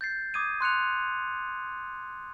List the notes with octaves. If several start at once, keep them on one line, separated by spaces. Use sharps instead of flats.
G6 A6 C7
D6 D#6 G#6 D#7
C6 F#6 C#7 F7